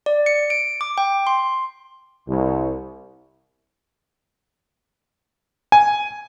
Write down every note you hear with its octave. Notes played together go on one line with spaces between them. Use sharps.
D5
C#7
D7
D6
G5
C6
C2
G#5